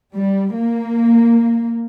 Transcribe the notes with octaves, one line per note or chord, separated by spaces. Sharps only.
G3
A#3